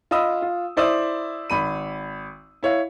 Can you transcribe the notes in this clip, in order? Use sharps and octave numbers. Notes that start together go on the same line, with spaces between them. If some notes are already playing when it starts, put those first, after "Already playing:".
F4 D#5 B5 D#6 E6
F4
E4 C5 D5 E5 D#6 E6
G#1 B5 D#7
E4 C#5 F5